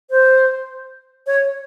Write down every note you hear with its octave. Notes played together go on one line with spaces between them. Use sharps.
C5
C#5